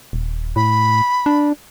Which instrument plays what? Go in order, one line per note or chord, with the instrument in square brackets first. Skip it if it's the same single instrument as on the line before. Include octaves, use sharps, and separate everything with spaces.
[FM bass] D#1
[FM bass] A2 [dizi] B5
[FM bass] D4